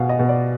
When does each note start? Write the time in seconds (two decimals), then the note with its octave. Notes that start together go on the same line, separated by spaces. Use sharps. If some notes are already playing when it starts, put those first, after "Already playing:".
Already playing: B2 B3 F5 G#5
0.09 D#5
0.19 B2
0.29 D5